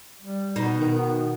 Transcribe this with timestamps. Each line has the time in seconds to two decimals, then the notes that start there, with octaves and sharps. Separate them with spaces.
0.22 G3
0.56 B2 B3 D#4
0.80 D#3